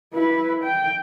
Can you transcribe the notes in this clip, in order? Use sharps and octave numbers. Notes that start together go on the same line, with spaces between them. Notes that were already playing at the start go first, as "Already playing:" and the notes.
E4 B4
G5